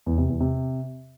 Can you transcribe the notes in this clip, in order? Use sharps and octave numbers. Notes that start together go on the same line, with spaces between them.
E2
C3
E2
C3